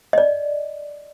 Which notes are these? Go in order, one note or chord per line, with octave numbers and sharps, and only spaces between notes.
D5 D#5